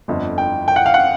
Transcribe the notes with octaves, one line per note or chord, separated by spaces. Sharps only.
G1 F2 D3
G5
G5
F#5
F5
F#5